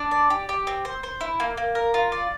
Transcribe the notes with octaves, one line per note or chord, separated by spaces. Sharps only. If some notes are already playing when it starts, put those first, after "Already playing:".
Already playing: D4
D5
G4
G4
C4
C5
C5
E4
A#3
A#3
A#4
F4
D5